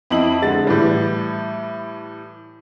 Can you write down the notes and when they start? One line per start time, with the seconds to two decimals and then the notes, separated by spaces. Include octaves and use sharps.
0.10 F2 E4 D#5 F#7
0.42 D3 G#3 A6
0.67 A2 E3 G3